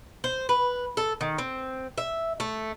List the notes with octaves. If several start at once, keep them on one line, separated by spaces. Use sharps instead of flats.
C5
B4
A4
D#3
C4
E5
A3